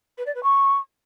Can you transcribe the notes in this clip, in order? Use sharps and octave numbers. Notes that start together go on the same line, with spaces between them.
B4
D5
B4
C#6